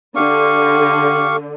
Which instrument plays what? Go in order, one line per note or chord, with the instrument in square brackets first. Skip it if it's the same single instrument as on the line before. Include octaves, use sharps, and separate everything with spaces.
[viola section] D3 [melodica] G4 F5 C#6